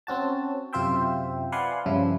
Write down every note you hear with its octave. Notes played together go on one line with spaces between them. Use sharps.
C4 C#4 F#4 A5
F#2 C3 F4 C5 E5 G5
B4 D5 F5 F#5 G#5 C6
G2 C#3 F3 E4